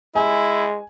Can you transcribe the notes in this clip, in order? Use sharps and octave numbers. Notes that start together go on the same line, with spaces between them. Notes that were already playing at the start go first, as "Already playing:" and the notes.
G#3 E4 G#5